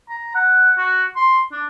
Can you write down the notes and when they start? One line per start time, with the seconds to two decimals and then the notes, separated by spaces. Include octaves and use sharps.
0.09 A#5
0.35 F#5
0.78 F#4
1.16 C6
1.52 D4